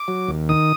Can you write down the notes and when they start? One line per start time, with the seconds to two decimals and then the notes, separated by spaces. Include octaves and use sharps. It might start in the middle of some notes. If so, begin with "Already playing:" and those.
Already playing: D6
0.08 F#3
0.28 D#2
0.49 D#3 D#6